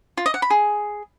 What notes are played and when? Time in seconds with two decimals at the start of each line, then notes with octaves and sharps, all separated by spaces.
0.17 F4
0.26 D#5
0.34 F#5
0.42 B5
0.50 G#4